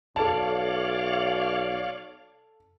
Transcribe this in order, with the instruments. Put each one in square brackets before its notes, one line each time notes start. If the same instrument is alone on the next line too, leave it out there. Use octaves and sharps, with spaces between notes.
[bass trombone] B1 [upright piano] A4 A5 [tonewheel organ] C#5 D5 F5